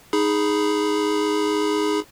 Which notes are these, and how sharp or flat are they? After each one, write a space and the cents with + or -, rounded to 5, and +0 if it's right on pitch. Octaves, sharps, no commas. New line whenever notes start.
D#4 +0 G#4 +0 B5 +0